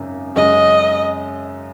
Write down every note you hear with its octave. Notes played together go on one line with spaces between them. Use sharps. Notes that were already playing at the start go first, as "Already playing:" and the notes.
Already playing: G#1 F#2 C#3
F#2 C#3 G#3 D#5